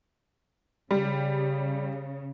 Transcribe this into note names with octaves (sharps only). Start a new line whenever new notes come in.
C#3 G3